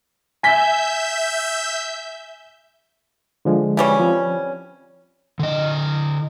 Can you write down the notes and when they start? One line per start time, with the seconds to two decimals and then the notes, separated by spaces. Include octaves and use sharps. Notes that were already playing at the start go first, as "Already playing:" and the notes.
0.43 E5 G#5 G6 B6
3.45 D3 F3 G#3
3.77 E3 G3 C#4
4.00 F3 C4
5.39 D3 D#5